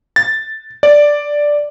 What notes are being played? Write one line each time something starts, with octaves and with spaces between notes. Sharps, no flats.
A6
D5